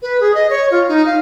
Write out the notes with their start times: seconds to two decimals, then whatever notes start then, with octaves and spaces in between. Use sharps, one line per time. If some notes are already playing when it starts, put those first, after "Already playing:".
0.02 B4
0.20 G#4
0.35 D#5
0.50 C#5
0.71 F4
0.88 D#4
1.06 F5